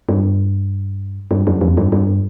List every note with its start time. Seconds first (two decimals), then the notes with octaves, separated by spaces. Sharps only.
0.09 G2
1.31 G2
1.47 F#2
1.61 F2
1.77 G2
1.92 G2